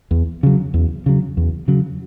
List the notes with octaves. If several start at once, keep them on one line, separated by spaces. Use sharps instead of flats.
E2
C#3 F#3
E2
C#3 F#3
E2
C#3 F#3